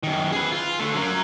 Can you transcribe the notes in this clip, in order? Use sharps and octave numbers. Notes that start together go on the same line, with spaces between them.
F#2 D#3
G#4 B4
F4
D3 A3
F#3 A#4